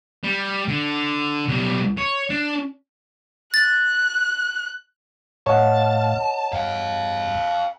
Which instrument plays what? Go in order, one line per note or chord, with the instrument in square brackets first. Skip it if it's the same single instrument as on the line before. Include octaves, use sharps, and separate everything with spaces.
[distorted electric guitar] G3
D3
B1 G3
C#5
D4
[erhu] F#6 [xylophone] A6
[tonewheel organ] A2 F5 [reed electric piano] C#5 D#5 F#5 [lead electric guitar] A5
[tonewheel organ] G2 [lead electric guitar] F5 G5